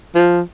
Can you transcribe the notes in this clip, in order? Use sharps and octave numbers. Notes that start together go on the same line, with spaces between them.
F3